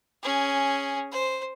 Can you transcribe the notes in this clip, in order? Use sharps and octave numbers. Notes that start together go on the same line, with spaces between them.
C#4 G#4
C5